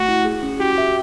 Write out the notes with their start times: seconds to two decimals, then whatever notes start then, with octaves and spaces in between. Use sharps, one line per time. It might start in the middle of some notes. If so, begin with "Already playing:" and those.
Already playing: A3 F#4
0.08 E4
0.25 G#4
0.43 C#4
0.60 F#4 G4
0.78 E5